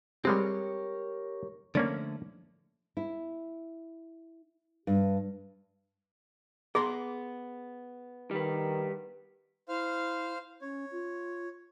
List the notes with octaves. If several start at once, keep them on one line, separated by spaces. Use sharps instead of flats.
G3 G#3 C4 G4 A#4 C#5
D3 F3 A3 A#3 C#4 D5
E4
G2
B3 G#4 A#5 C6
D#3 G3 B4
E4 C5 F5 F6
C#4 C#5
F4